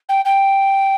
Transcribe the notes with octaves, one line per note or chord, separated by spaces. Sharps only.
G5
G5